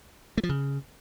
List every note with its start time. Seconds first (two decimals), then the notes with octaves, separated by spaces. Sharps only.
0.38 A3
0.43 F3
0.49 C#3